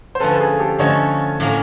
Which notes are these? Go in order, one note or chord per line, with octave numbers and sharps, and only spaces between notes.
C5
D3 F3 A3 C#4 A4 B4
G#4
G4 A4
D3 F3 A3 C#4 C#5 D#5
A2 F#3 A#3 C#4